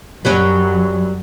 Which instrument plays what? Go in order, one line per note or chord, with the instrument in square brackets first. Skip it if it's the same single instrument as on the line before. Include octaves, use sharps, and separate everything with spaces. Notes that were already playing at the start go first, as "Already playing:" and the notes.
[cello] F#2 [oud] F#3 G3 C#4